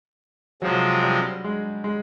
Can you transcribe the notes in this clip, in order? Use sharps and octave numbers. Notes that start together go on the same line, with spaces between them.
C3 F3 F#3 G#3 C4
G3
G#3
G#3